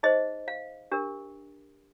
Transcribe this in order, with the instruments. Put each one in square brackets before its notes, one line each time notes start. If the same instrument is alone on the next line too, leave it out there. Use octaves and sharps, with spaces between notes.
[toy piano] D#4 G#4 C5 D#5
F5
D4 G4 A#4